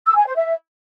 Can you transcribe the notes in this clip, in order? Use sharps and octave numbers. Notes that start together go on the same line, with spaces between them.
E6
G#5
C5
E5